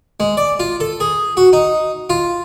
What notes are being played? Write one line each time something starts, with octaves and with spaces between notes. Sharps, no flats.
G#3
D5
F4
A4
G#4
F#4
D#4
F4